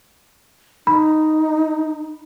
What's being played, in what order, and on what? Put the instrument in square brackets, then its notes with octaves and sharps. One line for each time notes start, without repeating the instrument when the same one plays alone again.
[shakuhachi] D#4 [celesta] B5